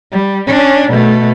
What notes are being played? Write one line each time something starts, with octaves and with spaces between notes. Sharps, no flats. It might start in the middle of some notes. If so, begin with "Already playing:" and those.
G3
C#4 D4
B2 A3